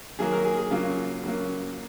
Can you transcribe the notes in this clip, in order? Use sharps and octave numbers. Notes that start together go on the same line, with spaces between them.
D#3 F#3 A#3 G#4
A#4
G#4
G#4
C#3 F#3 A#3 F4
C#3 F#3 A#3